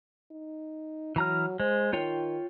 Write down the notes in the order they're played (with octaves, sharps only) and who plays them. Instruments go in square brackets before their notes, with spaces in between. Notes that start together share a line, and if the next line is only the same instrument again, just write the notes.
[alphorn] D#4
[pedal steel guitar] E3 A#5 F6 [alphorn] F#3
[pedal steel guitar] G#3 [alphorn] C5
[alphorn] D#3 [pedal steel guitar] F4 C#5 G5